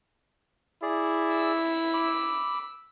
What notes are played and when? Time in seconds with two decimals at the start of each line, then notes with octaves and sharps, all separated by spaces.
0.82 E4 G#4 D5
1.36 E6
1.94 B5 D6